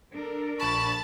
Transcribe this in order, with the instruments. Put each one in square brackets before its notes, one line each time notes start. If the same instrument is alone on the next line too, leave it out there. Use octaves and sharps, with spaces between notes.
[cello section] D4 A4 A#4
[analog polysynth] A#1 B5 [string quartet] A5 A6 [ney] C#6